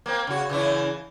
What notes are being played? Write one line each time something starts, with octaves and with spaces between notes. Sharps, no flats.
A#3 C4
C#3 F#4
C#3 E3 E4